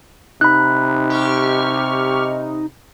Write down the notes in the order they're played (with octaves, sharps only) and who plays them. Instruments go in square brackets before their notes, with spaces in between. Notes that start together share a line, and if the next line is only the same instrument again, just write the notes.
[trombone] C3 [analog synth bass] D#4 [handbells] B5 F#6
[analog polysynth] G4 C#6 F6